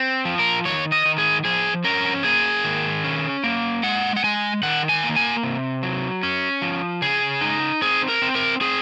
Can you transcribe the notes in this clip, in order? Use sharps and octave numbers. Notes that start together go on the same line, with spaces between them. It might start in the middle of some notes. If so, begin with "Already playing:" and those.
Already playing: C4
F3
A#4
D#3 C#5
D#5
D#3
G#4
F3 G#4
C#4 A#4
A#3 G#4
D#3
C#4
A#3
G#3 F#5
F#5
G#3 G#5
D#3 F#5
G#5
A#3
G#5
C3
F#3
C#4
F3
C#3 G#4
D#4
C4 G#4
A#4
C4
A#4
C4 G#4